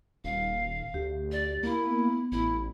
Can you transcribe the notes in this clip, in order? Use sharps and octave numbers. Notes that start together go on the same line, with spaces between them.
D#1 F5
D2 G4
D5
A#3 E4
B3
A1 E4